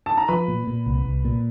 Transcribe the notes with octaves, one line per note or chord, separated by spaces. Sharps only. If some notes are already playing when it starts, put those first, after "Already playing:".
A5
A#5
F3 B4 B5
A#2
A#2
C2
C2
A#2